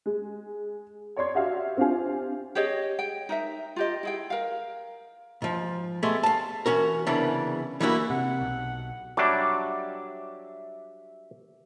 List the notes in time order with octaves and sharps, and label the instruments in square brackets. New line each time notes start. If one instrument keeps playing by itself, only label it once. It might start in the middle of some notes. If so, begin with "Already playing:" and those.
[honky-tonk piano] G#3
C#5 D5 C6 G#6
F#4 G4 E5 F5
C4 D4 F4 G4 F5 G#5
[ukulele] G4 G#4 C#5 D#5
G5
D#4 A#4 E5
F4 G4 D#5
E4 G#4 G5
A#4 F5
[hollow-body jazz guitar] G#2 F3
G#3 A3 B3 G4
F5 A5
E3 C#4 F#4 A#4
C2 C#3 E3 B3 D4 A#4
E3 G3 A#3 D#4 E4 F#4
[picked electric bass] C3 [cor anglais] F#5
[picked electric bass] B1
[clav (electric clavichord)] F#3 G3 D4 [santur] E5 D6